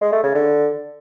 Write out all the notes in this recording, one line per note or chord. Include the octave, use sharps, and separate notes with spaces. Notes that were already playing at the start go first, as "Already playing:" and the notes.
G#3
A3
C#3
D3